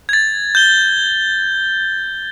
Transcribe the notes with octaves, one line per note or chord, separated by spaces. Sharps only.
G#6 A6
G6 G7